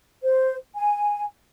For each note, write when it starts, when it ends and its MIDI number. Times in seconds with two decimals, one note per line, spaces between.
0.23 0.56 72
0.76 1.26 80